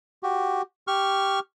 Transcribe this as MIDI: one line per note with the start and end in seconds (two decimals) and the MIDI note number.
0.23 0.62 66
0.23 0.62 67
0.87 1.39 67
0.87 1.39 85
0.87 1.39 89